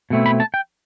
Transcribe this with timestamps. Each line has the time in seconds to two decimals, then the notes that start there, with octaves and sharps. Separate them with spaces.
0.10 B2 A3 C4 E4
0.26 B5
0.40 A5
0.54 G5